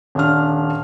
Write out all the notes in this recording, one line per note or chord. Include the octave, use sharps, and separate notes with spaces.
D#1 D4 F6